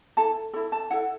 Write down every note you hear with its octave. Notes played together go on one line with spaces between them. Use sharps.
E4 A4 A5
E4 A4 B5
A5
E4 A4 F#5